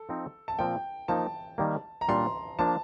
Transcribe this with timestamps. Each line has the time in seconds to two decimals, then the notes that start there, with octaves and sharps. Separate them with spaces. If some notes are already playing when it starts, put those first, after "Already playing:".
Already playing: A4
0.09 F3 C4 D#4
0.48 A5
0.59 A#2 F3 C4 G5
1.08 F3 A#3 D#4 A5
1.58 D#3 G3 A#3
2.01 A#5
2.08 A#2 G3 D4 C6
2.59 F3 A#3 D4 A5